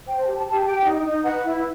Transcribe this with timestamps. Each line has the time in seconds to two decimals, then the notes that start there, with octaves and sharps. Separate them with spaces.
0.07 C5 G5
0.22 A5
0.26 G4
0.36 A5
0.46 G4 A5
0.65 G4 G5
0.85 D#4
1.04 D#4
1.24 B4 F#5
1.43 E4